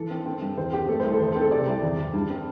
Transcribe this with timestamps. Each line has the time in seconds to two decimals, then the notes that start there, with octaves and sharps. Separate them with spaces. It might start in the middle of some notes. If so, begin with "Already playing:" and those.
Already playing: E3 A4
0.10 C4
0.26 C4
0.41 G2
0.57 E2 C5
0.72 C4 G4
0.89 A3 A4
1.00 C5
1.04 C2
1.12 A4
1.20 E2 C5
1.31 A4
1.36 C4
1.41 A4
1.51 C3 D5
1.68 C2
1.83 E2
1.98 E2
2.13 G2
2.30 C4